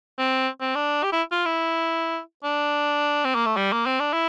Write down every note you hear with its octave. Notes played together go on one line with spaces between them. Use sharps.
C4
C4
D4
G4
E4
F4
E4
D4
C4
A#3
A3
G3
A#3
C4
D4
E4